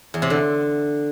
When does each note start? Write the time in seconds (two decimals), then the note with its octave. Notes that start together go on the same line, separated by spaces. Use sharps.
0.14 E2
0.22 C3
0.30 D3